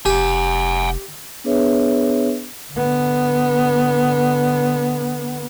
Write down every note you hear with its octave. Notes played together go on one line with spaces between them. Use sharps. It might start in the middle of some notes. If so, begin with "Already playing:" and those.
F1 G4 F#5 G#5
B3 D4 G#4 B4 C#5 E5
D3 B3